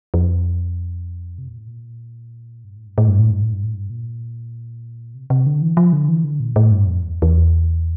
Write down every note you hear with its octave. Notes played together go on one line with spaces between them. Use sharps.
F2
C3
A#2
A2
A#2
G2
A2
G2
A2
G2
A2
G2
A2
G2
A2
G2
A#2
C3
C3
D3
E3
F3
D3
E3
D3
A#2
A2
G2
F2
E2
E2